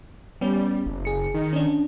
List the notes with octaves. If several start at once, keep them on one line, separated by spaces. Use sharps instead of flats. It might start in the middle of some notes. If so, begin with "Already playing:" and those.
G3 B3 C#4
F#1
G#4 C#7
D#3
C#4 D4